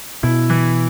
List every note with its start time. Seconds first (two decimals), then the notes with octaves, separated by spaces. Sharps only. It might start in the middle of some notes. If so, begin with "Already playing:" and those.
0.23 B2 E4
0.50 E3